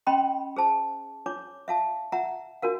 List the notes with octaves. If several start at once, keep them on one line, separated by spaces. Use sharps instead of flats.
C#4 D#5 G5 B5 C6
G#4 C5 A5
D4 C#5 D6
E5 F5 A5
E5 F#5 A#5
D4 F#4 A#4 F5